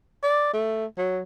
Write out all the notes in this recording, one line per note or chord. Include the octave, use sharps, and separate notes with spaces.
D5
A3
F#3